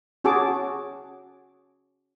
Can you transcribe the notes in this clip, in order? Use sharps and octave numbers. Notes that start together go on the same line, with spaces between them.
C#4 F#4 G#4 A5 D6